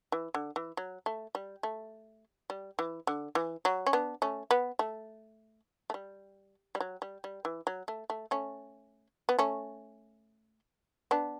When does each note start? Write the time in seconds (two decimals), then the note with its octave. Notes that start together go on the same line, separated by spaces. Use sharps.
0.12 E3
0.34 D3
0.56 E3
0.77 F#3
1.06 A3
1.35 G3
1.63 A3
2.50 G3
2.79 E3
3.07 D3
3.35 E3
3.65 F#3
3.86 C#4
3.93 B3 D4
4.22 A3 C#4
4.51 B3
4.79 A3
5.90 A3
5.94 G3
6.75 G3
6.80 F#3
7.02 G3
7.24 G3
7.45 E3
7.67 F#3
7.88 A3
8.10 A3
8.31 A3 C#4
9.29 B3
9.39 A3 C#4
11.11 B3 D4